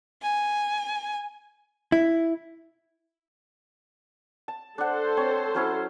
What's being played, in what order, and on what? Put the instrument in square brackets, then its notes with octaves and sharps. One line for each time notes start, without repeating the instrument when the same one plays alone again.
[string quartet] G#5
[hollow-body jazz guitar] E4
[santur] A5
[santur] D4 F#5 [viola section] A4 C5
[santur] C4 C#5
F#3 C#4 E4